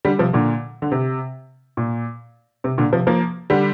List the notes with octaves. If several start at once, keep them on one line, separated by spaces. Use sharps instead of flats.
D3 G3
C3 F3
A#2 D3
D3
C3
A#2
C3
A#2 D3
C3 F3
F3 A#3
D3 G3